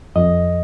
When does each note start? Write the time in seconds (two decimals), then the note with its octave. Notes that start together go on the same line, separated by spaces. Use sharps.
0.16 F2 D#5